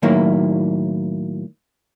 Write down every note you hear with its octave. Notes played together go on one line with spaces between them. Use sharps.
A2 D#3 F#3 A#3 E4